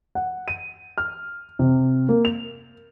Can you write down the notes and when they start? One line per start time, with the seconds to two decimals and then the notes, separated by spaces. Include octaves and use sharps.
0.15 F#5
0.48 D#7
0.98 F6
1.59 C3
2.09 A#3
2.25 F7